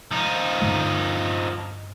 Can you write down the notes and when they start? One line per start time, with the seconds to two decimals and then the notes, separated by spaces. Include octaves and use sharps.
0.11 F3 D#4
0.62 G2 D3 G#3